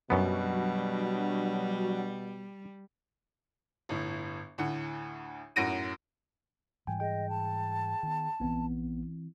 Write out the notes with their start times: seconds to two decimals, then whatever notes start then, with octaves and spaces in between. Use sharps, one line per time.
0.10 F#2 B2 F#3 G3 B3 D4 F#4
3.89 G1 A2
4.58 D2 A2 F#5
5.56 F#2 A2 F#4 A#6 D7 D#7
6.87 G#2 E3 G3 G5 G#5
7.00 G#4 D#5 G5
7.29 A5
8.03 D#3 B3
8.40 A#1 E3 B3 C4